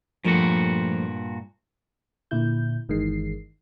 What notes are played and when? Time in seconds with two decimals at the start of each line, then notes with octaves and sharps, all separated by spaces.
0.25 G2 A#2 F3 A3 F#4
2.31 A#2 D3 E4 G6
2.89 G1 D#3 E3 G#3 C7